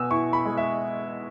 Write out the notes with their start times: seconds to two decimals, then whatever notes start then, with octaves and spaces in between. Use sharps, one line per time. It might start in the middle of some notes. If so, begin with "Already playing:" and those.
Already playing: B2 B3 G#5 E6
0.11 E4 C#6
0.33 B5
0.45 G#3
0.57 E5